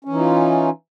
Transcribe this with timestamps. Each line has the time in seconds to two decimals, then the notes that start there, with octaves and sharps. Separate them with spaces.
0.05 C#4
0.09 E3
0.13 D#4
0.17 F4